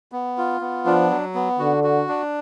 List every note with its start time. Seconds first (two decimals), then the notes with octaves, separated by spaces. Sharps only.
0.12 B3
0.38 F4
0.61 B3
0.86 F3 D4
1.10 F#3
1.35 B3
1.59 D3 F#4
1.84 F#4
2.09 D4